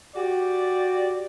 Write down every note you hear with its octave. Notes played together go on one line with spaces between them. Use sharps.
F#4 G4 D5